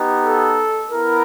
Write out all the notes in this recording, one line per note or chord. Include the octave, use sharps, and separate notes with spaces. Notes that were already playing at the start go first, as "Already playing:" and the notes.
Already playing: B3 D#4 G4
A4
B3 E4 A#4